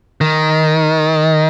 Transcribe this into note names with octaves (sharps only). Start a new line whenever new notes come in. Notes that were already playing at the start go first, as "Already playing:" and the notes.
D#3